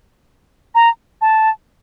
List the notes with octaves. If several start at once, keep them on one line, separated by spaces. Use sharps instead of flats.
A#5
A5